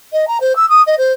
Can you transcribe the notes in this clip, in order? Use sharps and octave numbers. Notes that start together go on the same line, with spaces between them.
D#5
A#5
C5
E6
D#6
D#5
C5